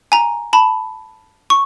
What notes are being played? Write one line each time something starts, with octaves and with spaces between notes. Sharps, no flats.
G#5 A#5
A5 B5
C#6